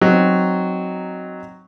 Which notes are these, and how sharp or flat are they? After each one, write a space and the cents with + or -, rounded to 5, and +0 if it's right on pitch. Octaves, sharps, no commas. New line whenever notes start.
F#3 +0 C4 +0 D#4 -10